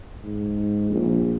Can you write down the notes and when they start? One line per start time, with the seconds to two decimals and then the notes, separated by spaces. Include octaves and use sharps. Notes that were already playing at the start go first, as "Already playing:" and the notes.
0.23 G#2
0.90 A#1